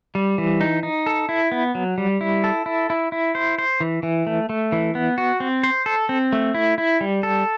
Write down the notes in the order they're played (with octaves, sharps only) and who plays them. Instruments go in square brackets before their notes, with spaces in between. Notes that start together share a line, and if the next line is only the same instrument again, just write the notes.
[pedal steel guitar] G3
E3
D#4
D#4
A4
E4
B3
F#3
G3
E4
A4
E4
E4
E4
C5
C5
E3
E3
A3
A3
E3
B3
F#4
C4
C5
A4
C4
A3
E4
E4
G3
A4